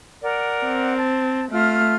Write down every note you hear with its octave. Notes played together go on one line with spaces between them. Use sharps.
A#4 D5 F#5
C4
A5
A3 F4 F6